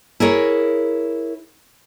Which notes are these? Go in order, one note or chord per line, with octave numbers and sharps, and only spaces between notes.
E4 G#4 A#4 C#5